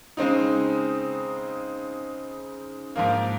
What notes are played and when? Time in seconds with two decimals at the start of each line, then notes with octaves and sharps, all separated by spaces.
0.17 C#3 G#3 C4 D#4
2.96 G#2 F3 A#3